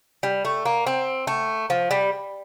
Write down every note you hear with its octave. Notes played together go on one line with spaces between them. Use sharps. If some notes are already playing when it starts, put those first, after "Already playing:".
G3
A3
A#3
C4
A3
F3
G3